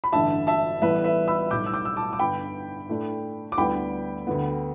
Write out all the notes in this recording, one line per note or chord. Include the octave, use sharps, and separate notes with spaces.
B5
A1 G2 D3 E5 A5
E5 A5
A1 A2 E3 G3 B3 B4 E5
B4 E5
B5 E6
B1 A2 G3 E4 D6 G6
E6
D6 G6
E6
A5 D6
D6
G2 D3 B3 G5 B5
A2 A3 D4
D6
D2 D3 G3 B3 E4 G5 B5
D2 D3 B3